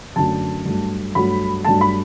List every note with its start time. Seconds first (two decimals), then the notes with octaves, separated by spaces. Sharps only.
0.16 F#2 D3 F#3 A3 A5
0.65 G2 F#3 A3
1.15 G2 F#3 A3 B5
1.64 G2 F#3 A3 A5
1.81 B5